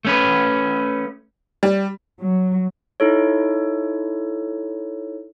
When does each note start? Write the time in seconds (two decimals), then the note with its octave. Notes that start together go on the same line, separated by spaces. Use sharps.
0.05 A3 C#4 B4
1.63 G3
2.20 F#3
3.00 D#4 E4 A4 C#5